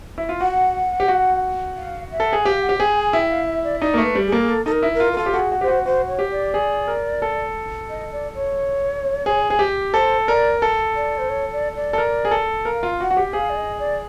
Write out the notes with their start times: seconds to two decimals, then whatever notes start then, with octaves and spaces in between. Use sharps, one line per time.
0.18 E4
0.29 F4
0.40 F#4 F#5
1.00 G4
1.08 F#4
1.77 F5
2.11 E5
2.20 A4
2.33 G#4
2.45 G4 F5
2.62 F#5
2.69 G4
2.79 G#4 G5
2.96 G#5
3.13 E4 G5
3.30 F5
3.47 E5
3.64 D5
3.81 D#4 D5
3.94 A#3
3.98 A3
4.04 B4
4.15 G3
4.27 G#4
4.32 A#3 A4
4.41 G#4
4.49 A4
4.66 D#4 A4
4.72 A#4
4.83 E4
4.95 A#4
5.00 F4
5.13 A#4
5.17 F4 A4
5.26 G4
5.32 F#4 A4
5.40 G#4
5.52 F#4
5.61 G4 C5
5.68 F#4
5.86 F#4 C5
6.08 C#5
6.19 G4
6.31 D5
6.54 G#4
6.88 A#4
7.22 A4
7.90 D#5
8.12 D5
8.35 C#5
9.26 G#4
9.50 G#4
9.59 G4
9.94 A4 C5
10.27 A#4 D5
10.62 A4
10.96 D5
11.18 C5
11.29 C#5
11.53 D5
11.75 D5
11.93 A4
11.98 A#4
12.25 G#4
12.31 A4
12.65 A#4 F5
12.83 F4
13.00 F#4 F#5
13.11 F#4
13.17 G4
13.33 G#4 F5
13.50 D5
13.57 D#5
13.79 D5